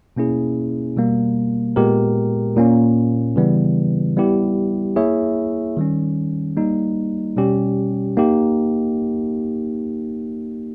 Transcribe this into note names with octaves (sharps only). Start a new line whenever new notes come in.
B2 A#3 C#4 E4 G#4
B2 G3 A#3
A#2 G#3 B3 G4 A#4
A#2 A#3 C#4
C#3 E3 G3 B3
G3 B3 E4 G4
A#3 E4 G#4 C#5 E5
D#3 G3 C#4
G3 A#3 D#4
B2 G3 C#4 G4
A#3 D#4 G4